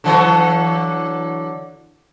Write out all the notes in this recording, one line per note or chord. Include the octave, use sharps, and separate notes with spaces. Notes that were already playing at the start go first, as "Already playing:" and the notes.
D3 E3 F#3